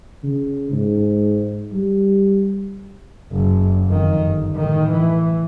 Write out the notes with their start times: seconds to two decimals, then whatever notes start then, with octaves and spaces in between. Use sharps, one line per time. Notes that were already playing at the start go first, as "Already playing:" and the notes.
0.23 C#3
0.72 G#2
1.73 G3
3.32 F#1
3.87 F2 D#3
4.22 G1
4.56 A2 D#3
4.90 E3